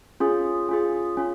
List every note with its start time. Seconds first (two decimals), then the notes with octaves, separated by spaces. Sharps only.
0.20 C#4 F4 G#4
0.69 C#4 F4 G#4
1.17 C#4 F4